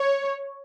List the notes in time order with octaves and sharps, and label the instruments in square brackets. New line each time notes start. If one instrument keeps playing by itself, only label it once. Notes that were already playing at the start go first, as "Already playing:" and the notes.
Already playing: [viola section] C#5